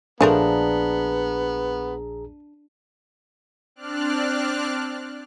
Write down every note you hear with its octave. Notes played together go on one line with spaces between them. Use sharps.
A#1 F3 A3 B3 D4 G#4 A#4 A#5
C4 D4 D5 F6 F#6